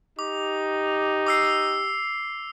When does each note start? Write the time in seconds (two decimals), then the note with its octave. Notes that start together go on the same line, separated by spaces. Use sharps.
0.19 D#4 G4 D6
1.27 D6 E6 C7